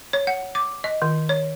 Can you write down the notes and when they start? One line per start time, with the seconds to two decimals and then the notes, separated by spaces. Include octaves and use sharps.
0.13 C#5
0.27 F#5
0.55 D6
0.84 D#5
1.02 D#3
1.29 C#5